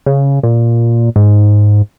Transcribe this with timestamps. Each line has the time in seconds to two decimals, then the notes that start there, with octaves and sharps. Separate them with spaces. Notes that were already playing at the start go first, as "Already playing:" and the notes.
0.06 C#3
0.43 A#2
1.16 G#2